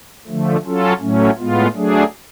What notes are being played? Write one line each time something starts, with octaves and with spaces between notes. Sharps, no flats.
D3 F3 A3
F#3 C#4 F4 A4
A2 F#3 A3 C#4
A2 G#3 B3 F4
F#3 A3 D4 G#4